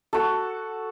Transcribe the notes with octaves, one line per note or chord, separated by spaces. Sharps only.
F#4 A4